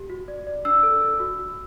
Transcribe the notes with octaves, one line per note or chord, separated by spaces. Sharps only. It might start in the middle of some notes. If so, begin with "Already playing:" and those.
Already playing: G4
F#4
D5
D5
D4 E6
A4
A4
F#4
F#4